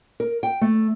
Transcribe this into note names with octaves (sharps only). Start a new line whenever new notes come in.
A#4
G5
A3